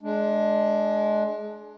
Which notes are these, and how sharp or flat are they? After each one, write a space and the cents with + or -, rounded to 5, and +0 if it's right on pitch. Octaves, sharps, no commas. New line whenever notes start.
G#3 +25 D4 +5